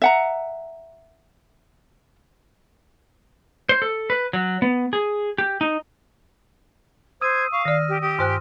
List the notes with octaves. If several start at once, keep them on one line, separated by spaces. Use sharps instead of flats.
E5 F#5 A#5
C5
A4
B4
F#3
B3
G#4
G4
D#4
C5 D#6 E6 G#6 D#7
F5 C#6
D#3 D5 F6 A#6
G4
G4 D#6
G2 C5 G#5 C6 F6 F#6